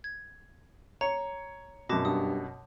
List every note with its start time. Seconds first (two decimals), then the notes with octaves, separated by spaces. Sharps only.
0.04 G#6
1.01 C#5 A#5 C#7
1.89 F#2 B2 A5 D6 A#6
2.05 G2 D#6